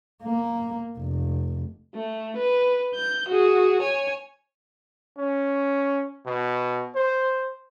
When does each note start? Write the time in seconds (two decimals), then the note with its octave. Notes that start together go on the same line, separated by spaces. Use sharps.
0.23 A#3
0.98 F1
1.95 A3
2.36 B4
2.95 G6
3.28 F#4 G#4
3.82 C#5 G#5
5.17 C#4
6.26 B2
6.95 C5